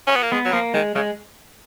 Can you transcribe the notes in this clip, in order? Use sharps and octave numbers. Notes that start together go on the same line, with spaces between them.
C#4
B3
A#3
G#3 B3
F#3
F3 A#3
D#3 G#3
C#3 G#3